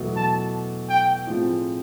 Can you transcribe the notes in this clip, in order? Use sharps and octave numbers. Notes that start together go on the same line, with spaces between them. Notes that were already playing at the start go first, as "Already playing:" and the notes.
Already playing: E2 B2 F#3 A3
A5
G5
A2 F3 G#3 C4 F4